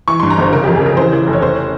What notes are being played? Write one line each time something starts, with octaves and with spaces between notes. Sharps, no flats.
E3 C#6
C6
G2
A#5
G1 C5
C#3 A#4
G4
F2
G#4
C#3 A#4
E3 C5
E3
F1
C#5
C#4 C5